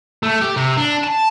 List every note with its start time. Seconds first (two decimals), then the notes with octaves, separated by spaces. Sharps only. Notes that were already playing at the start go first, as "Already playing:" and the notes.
0.23 A3
0.42 G4
0.57 C3
0.77 D4
1.04 A5